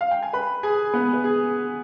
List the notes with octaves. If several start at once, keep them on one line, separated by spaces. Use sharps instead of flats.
F5
G5
G#5
B4 B5
G#4 G#5
B3 B4
B4
G#4